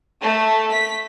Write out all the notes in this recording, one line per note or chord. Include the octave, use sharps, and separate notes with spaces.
A3
B6